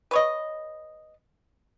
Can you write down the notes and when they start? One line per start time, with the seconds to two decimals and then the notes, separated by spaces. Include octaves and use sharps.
0.11 B4 C#5 D#5